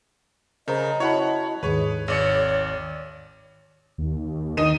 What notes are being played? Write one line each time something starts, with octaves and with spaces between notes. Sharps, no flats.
C#3 A#4 C5 D#5 A#5
E4 F#4 C#5 F#5 A5 B5
D#2 G#2 D#3 G#4 B4 C#5
G#1 C#5 D5 C#7
D#2
D#3 D#4 D#7 E7